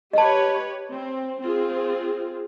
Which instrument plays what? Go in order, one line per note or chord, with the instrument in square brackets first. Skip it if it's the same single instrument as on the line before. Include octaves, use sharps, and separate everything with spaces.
[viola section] G4 B4 C#5 [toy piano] D#5 A5
[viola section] C4
C4 F4 G#4